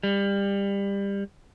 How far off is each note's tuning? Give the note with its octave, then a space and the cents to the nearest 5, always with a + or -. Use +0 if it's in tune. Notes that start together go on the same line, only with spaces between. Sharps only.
G3 +25